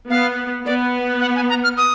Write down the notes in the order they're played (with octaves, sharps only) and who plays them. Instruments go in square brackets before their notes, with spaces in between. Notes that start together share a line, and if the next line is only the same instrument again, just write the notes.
[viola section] B3 [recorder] F5
[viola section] B3 [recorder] D5
[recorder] F#5
G#5
A#5
F6
D#6